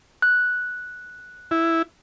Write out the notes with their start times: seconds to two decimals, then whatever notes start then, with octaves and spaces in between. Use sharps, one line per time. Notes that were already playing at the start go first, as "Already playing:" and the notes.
0.22 F#6
1.51 E4